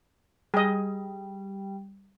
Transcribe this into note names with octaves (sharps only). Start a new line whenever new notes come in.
G3 G#4 D#5